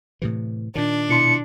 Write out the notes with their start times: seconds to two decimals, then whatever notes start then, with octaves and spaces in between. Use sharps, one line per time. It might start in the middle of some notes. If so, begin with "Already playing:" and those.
0.22 A2 C3 E3
0.75 A#2 D#3 D4
1.09 B2 E4 C6 C#7